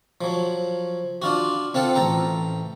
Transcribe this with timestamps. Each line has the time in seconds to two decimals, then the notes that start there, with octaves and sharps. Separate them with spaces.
0.21 F3 F#3
1.22 D4 F4 F#4
1.74 C4 F4 A4 F#5
1.95 A1 A4 G5 A#5